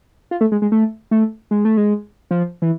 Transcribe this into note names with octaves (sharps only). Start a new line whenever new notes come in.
F4
A3
G#3
G#3
A3
A3
G#3
A3
G#3
F3
E3